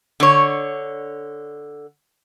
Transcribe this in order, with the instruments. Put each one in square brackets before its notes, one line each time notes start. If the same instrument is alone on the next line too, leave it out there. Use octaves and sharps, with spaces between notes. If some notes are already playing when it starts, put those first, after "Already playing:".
[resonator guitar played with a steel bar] D3 C#5